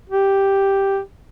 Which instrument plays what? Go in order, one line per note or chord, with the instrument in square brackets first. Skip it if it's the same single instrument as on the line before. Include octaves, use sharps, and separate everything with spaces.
[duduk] G4